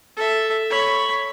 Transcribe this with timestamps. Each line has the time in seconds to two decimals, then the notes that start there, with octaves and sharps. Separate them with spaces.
0.17 A4 E5
0.70 C#5 B5